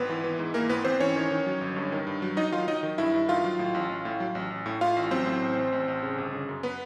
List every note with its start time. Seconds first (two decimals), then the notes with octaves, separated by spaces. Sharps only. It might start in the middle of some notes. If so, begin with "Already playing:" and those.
Already playing: G#1 B3 B4
0.09 E3
0.24 E3
0.39 G#2
0.54 E3 A#3 A#4
0.69 G#1 B3 B4
0.85 G#1 C4 C5
1.00 E3 C#4 C#5
1.16 D#3
1.31 D#3
1.46 F#3
1.61 G1
1.76 G2
1.92 D#3
2.07 G2
2.22 F#3
2.37 F#3 D#4 D#5
2.52 D#3 F4 F5
2.68 F#3 D#4 D#5
2.83 D#3
2.98 G2 E4 E5
3.14 G2
3.29 D#3 F4 F5
3.44 F#3
3.59 A2
3.74 A1
3.89 A1
4.05 A2
4.20 F#3
4.35 A1
4.50 A1
4.66 A2
4.81 A2 F4 F5
4.97 A1
5.11 F#3 C4 C5
5.26 A2
5.42 A1
5.57 A1
5.72 A1
5.88 A1
6.03 C#3
6.18 G1
6.33 C#3
6.49 F#2
6.63 B3 B4